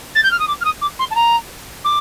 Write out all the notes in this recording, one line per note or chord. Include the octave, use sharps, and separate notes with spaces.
A6
G6
F6
D#6
D6
F6
D#6
D6
C6
A5
A#5
D6